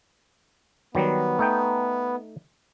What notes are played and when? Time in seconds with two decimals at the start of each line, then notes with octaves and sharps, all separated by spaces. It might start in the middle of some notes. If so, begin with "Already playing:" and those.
0.95 D#3 F#3 G3 B3
1.39 A3 D#4 G5